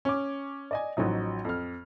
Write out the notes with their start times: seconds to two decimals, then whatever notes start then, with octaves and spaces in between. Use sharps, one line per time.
0.05 C#4 D6
0.71 D5 D#5 G#5
0.97 A1 F3 F#3 D#4
1.45 F2 F6